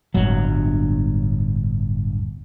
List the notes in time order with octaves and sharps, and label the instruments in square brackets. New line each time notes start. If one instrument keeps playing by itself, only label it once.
[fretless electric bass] D1 G1 F#3